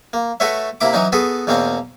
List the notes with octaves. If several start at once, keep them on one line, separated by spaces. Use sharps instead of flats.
A#3
A3 F#4 A4 B4 C#5 E5
C3 A#3 E4 B5 D6
E3 F#3 C#4 D#4
B3 F#4 G#4 A4 B4
E2 B2 A#3 C4 C#4